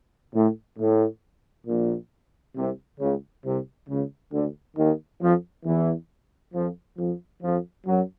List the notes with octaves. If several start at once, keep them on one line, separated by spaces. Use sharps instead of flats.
A2
A2
A#1 A#2
C2 C3
C#2 C#3
C2 C3
C#2 C#3
D2 D3
D#2 D#3
F2 F3
E2 E3
F2 F3
F2 F3
F2 F3
F#2 F#3